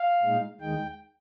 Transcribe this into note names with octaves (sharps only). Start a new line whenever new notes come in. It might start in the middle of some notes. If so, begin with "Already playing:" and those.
Already playing: F5
A#2 G#3 D#4
D#2 D#3 G#3 D#4 G5